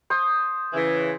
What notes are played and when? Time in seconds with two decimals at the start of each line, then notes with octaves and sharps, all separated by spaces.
0.10 C5 D#6
0.73 C#3 E3